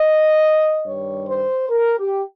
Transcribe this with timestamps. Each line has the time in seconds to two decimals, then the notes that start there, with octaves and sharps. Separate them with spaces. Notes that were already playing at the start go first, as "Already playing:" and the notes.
Already playing: D#5
0.84 G2 D#3 G3 C#5
1.28 C5
1.70 A#4
1.99 G4